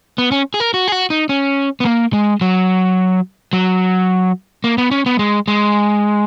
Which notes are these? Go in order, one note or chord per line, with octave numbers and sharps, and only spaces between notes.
B3
C#4
G#4
A#4
F#4
G#4
F#4
D#4
C#4
B3
A#3
G#3
F#3
F#3
A#3
B3
C#4
B3
G#3
G#3